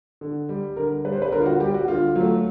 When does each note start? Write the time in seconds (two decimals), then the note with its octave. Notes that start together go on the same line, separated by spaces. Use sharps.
0.21 D3
0.49 G3
0.76 D3 A#4
1.05 G3 B4
1.12 C5
1.22 B4
1.32 D3 A#4
1.40 F4
1.46 F#4
1.60 G3 G4
1.74 F#4
1.88 D3 F4
2.15 F#3 A3